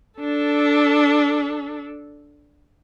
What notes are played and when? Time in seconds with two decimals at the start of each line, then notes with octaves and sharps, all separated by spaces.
0.20 D4 A4